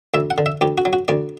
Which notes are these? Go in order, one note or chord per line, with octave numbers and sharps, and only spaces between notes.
D2 E5
F#5
D3
E5
D2 G4
F#4
F#3
F#4
D2 D5